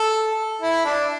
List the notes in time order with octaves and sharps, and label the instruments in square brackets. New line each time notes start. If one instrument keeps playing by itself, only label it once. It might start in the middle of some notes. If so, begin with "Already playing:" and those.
Already playing: [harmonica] A4
E4
D4